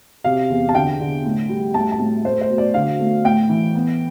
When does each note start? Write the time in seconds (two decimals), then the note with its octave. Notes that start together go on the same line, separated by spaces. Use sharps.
0.24 C3 F5
0.50 E2
0.69 A5
0.75 D3 G5
1.00 D3
1.24 A2
1.49 G3
1.74 A2 A5
1.92 A5
1.99 A2
2.24 A3 C5
2.41 C5
2.49 B2
2.58 D5
2.74 D3 F5
3.00 A3
3.24 A2 G5
3.49 E3
3.75 B3